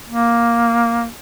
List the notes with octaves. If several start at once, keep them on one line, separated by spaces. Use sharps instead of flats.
A#3